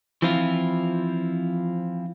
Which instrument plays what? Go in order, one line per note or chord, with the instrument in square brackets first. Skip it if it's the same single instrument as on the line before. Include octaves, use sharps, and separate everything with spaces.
[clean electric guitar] E3 F3 C4 E4 F4